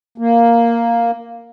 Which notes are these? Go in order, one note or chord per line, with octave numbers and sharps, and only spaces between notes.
A#3